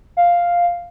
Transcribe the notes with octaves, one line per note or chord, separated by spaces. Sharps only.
F5